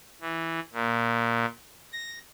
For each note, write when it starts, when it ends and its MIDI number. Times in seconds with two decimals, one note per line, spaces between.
0.21 0.60 52
0.73 1.45 46
1.93 2.18 94